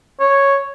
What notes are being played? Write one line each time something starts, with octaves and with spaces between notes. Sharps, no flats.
C#5